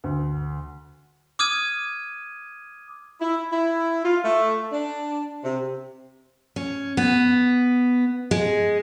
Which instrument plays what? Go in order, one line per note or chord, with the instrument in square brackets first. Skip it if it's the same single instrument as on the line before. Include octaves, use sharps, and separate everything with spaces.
[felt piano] D2
[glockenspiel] D6 D#6 F6 G#6 D#7
[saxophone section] E4
E4
F4
A3
D4
C3
[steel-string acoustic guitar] C#4
B3
G#3